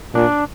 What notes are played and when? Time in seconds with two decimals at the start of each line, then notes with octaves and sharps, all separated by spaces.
0.14 A#2 D4